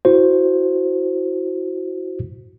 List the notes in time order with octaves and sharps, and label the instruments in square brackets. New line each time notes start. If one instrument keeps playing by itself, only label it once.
[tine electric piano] E4 F#4 C5